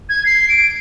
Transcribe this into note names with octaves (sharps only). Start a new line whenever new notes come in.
G#6
C7
D7